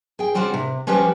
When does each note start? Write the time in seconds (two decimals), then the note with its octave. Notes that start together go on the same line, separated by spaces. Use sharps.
0.19 G#4 G5
0.35 C#3 G3 C4 F4 F#4 C5
0.54 C3
0.87 F3 G3 C#4 G4 B4 C5